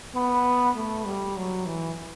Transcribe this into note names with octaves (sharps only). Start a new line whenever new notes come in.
B3
A3
G3
F#3
E3